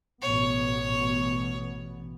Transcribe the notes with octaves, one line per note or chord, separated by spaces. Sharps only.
A1 B2 B3 C#5